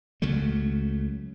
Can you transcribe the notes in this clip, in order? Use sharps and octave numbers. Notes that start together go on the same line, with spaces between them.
C#2 C#3 F#3 A3